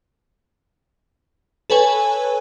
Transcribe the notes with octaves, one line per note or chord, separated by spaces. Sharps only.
A4 B4 C#5 G#5